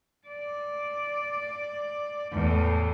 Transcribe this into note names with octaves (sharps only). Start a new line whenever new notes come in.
D5
E2 A2